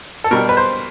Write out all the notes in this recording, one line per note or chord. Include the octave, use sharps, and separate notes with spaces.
A4
B2 G3 A#4
B4
C5